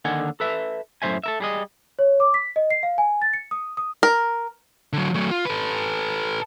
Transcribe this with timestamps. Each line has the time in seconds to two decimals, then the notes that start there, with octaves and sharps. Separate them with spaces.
0.05 D#2 D3 D#3 F#5 G#5
0.40 A4 B4 E5
1.02 F#2 A2 D#3 C5 E5 G#5
1.23 A4 A#4 E5
1.40 G3 G#4 D#5
1.99 C#5
2.20 D6
2.34 B6
2.56 D#5
2.71 C7
2.83 F5
2.98 G#5
3.22 A6
3.33 C#7
3.51 D#6
3.77 D#6
4.03 A#4
4.93 D3 F#3
5.15 F#3 A3
5.31 F4
5.45 A4 B4